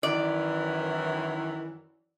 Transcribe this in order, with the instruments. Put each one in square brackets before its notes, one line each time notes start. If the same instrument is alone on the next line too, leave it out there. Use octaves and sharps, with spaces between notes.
[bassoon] F#2 [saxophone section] D#3 E3 [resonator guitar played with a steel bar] D5